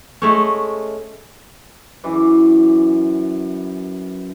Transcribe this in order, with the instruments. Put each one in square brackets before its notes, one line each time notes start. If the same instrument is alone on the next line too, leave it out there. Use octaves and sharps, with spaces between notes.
[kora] G#3 A3 C#4
[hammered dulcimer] F#2 E3 E5 D6